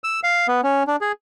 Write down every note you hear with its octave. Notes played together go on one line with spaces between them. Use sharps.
E6
F5
B3
C#4
D4
G#4